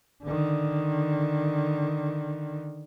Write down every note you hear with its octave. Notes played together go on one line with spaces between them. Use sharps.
D3 D#3